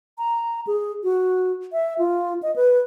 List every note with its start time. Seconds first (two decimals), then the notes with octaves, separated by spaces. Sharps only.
0.18 A#5
0.67 G#4
1.03 F#4
1.72 E5
1.99 F4
2.43 D#5
2.56 B4